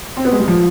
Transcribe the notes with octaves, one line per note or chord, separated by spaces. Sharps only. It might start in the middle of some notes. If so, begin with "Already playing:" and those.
C4
B3
G#3
G3
F3